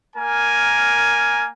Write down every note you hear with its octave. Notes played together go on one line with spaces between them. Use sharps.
A#3 A#4 G#5